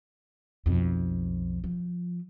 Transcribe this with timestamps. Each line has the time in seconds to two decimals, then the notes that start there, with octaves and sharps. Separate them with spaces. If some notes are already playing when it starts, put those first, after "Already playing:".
0.66 B1 F2
1.64 F3